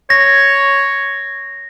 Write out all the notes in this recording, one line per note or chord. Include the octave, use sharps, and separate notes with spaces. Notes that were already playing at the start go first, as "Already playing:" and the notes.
C#5 A#6